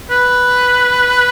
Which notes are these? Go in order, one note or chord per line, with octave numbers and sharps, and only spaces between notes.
B4